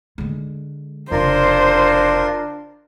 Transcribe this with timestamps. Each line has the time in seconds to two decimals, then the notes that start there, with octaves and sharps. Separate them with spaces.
0.18 D3 G#3
1.11 F1 C#3 D4 F4 A#4 C5